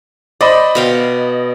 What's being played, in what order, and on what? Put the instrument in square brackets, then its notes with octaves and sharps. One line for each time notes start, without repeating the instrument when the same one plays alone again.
[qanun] C5 [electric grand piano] D5 D#5 B5
[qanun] B2 F5 G5